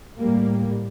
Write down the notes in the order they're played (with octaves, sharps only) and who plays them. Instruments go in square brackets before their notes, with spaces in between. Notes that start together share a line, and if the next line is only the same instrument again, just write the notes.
[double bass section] A2 G3 A#3